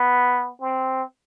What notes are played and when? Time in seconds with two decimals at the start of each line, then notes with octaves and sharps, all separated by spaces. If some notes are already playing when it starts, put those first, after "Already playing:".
Already playing: B3
0.61 C4